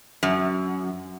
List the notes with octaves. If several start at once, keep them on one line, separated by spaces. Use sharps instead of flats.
F#2